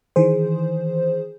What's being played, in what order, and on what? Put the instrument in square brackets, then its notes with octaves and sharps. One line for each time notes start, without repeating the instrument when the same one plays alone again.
[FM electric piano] D#3 E3 G#4 C5